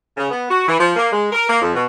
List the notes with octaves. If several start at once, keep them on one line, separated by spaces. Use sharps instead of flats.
C#3
B3
F#4
E3
F3
A#3
G#3
A#4
A#3
F2
B2